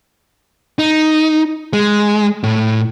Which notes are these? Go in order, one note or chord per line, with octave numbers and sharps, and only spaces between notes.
D#4
G#3
A2